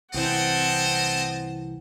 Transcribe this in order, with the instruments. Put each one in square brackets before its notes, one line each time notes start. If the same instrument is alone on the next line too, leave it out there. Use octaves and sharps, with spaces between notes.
[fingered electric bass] C2 E3 [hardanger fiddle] C4 A5 [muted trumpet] D#5 [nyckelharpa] F#5 G5